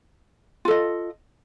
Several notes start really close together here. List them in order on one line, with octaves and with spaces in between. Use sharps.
F4 A4 D#5